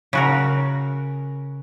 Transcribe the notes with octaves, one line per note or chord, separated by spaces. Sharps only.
C#3 F#4 A#4